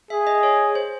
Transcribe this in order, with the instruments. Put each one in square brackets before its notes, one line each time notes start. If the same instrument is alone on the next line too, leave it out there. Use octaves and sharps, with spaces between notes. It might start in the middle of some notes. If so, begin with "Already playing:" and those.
[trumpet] G#4 [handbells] E5
[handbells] D#5
C#5
C5